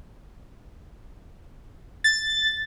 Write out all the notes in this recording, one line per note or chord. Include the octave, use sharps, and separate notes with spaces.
A6